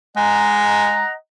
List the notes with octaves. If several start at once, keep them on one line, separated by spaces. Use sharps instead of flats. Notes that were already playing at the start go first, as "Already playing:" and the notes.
G#3 D#5 F#5 A#5